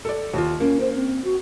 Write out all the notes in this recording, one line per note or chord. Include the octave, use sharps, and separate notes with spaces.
A4 D5
D#2 F4
A#3 C#4
C5
C4
F#4